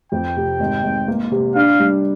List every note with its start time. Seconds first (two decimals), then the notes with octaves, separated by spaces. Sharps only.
0.12 F2 G5
0.36 C3
0.60 G#1
0.84 G#1
1.08 A#3
1.31 C3
1.55 D4 F5
1.80 G3